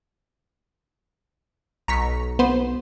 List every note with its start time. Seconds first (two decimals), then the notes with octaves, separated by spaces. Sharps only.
1.88 B1 A#5 C#6 B6
2.39 B3 C5